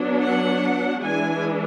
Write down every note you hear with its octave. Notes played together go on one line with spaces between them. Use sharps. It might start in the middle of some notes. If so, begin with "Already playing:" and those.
Already playing: F#3 B3 D4
F#5
E3 G#3 D4 G#5